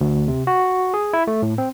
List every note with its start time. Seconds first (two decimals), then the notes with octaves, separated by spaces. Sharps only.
0.01 D2
0.28 C3
0.47 F#4
0.94 G#4
1.13 E4
1.27 A3
1.42 A2
1.58 C4